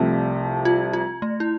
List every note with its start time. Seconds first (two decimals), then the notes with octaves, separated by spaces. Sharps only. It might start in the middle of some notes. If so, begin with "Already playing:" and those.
Already playing: C2 C3 F3 A3
0.65 F4
0.93 F4
1.22 A3
1.40 E4